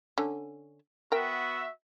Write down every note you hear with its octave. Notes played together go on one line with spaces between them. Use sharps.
D3 C#4
B3 F#4 A#4 E5 G5